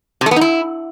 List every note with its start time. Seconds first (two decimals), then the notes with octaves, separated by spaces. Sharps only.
0.21 C3
0.26 A3
0.31 B3
0.36 D#4
0.41 E4